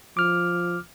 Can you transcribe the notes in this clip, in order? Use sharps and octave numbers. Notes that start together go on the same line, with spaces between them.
F3 D6 F6